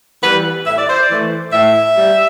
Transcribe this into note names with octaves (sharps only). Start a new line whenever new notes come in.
E3 G3 B4
A2 E5
D5
C5
D5
E3 A3
A2 E5
G3